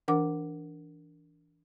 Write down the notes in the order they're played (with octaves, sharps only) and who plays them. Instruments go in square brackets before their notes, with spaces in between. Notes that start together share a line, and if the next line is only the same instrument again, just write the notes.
[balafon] E3 D4 A#4 F#5 D6